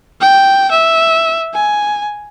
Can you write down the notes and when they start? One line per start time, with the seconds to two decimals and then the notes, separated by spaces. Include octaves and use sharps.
0.21 G5
0.71 E5
1.54 G#5